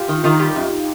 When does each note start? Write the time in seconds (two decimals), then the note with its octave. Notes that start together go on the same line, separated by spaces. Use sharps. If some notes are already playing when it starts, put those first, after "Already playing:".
Already playing: F4 G4
0.09 D#3
0.24 D#3 D#4 F4
0.39 G3 F4 G4
0.56 F#2